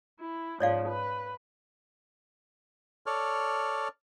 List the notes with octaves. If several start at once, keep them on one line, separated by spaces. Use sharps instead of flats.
E4
G#2 C#3 F3 C#5 D5 F5
B4
A4 C#5 D5 F6